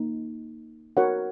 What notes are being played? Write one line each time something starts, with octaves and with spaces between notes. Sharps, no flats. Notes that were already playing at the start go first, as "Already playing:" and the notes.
Already playing: A#3 D#4
F#4 A#4 C#5 F#5